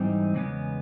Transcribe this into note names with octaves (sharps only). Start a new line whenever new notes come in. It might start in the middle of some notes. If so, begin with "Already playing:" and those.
Already playing: G#2 E3 G3 C4 D#4
E2 C#3 G#3 B3